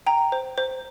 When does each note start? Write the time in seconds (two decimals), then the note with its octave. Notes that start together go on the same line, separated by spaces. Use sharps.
0.07 G5 A#5
0.32 C5
0.58 C5